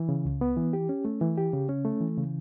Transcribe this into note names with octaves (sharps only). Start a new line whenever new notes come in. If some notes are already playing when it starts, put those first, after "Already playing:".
Already playing: E3
C#3
C#2
B3
E3
G4
C#4
A3
E3
G4
C#3
C#4
A3
E3
C#3